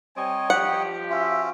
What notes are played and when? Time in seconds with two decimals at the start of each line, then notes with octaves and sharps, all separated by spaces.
0.17 G3 C4 C#5 D#5 G#5
0.50 F3 G4 F#5
1.10 C#4 F4 F#4 E5